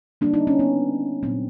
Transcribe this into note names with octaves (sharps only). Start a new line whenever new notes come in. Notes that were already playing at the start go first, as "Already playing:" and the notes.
D3 G3 A#3 D4
D#4
C#4
B3
A#2 F#3 B3 C4